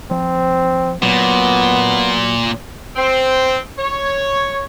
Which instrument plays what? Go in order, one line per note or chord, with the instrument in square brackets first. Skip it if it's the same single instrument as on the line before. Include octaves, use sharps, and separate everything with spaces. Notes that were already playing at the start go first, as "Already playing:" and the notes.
[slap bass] F3 [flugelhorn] C4
[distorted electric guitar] A#2 [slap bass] F#3 [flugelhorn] B3
[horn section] C4
C#5